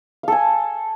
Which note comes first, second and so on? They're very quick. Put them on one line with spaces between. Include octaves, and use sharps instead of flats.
F5 A4 G#5